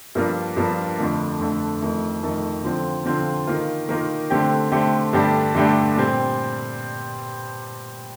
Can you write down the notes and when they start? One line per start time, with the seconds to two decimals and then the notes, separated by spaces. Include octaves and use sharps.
0.15 G2 F3 A#3 D4 F4
0.57 G2 F3 A#3 D4 F4
0.98 F2 D3 A3
1.40 F2 D3 A3
1.81 F2 D#3 A3
2.23 F2 D#3 A3
2.64 D3 F3 C4 F4
3.05 D3 F3 C4 F4
3.47 D#3 A#3 F4
3.89 D#3 A#3 F4
4.30 D3 A3 C4 G4
4.72 D3 A3 C4 G4
5.13 G2 D3 A3 D4 G4
5.55 G2 D3 A3 D4 G4
5.96 A#2 G3 C4